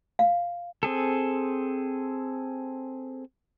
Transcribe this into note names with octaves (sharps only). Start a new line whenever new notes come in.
F5
C4 G#4 A4